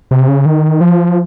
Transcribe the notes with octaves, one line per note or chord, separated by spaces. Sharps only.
C3
C#3
D#3
F3